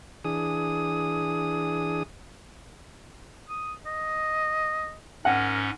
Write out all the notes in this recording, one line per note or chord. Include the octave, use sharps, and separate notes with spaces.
E3 D4 G#4 D#6
D#6
D#5
G#2 C#4 A#4 F#5